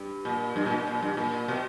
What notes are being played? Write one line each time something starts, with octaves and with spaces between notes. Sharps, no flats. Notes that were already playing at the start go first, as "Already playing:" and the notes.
Already playing: G2
A#2
G2
A#2
B2
A#2
G2
A#2
B2